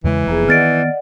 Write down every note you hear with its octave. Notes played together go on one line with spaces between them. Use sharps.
E2 C#3 E3 G#3
F1 F2 A#3 B3 G#4
D#3 B3 D5 D#5 F#5 F6 A6 D7